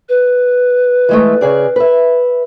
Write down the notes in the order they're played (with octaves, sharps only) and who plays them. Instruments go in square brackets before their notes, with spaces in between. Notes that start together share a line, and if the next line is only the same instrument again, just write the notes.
[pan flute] B4
[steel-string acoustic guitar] E3 G#3 A3
C#3 G#4 D5
B4 E5